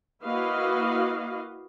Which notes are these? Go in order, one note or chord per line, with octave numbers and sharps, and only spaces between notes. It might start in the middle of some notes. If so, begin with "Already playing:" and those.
A#3 E4 F#4 B4 D#5 F5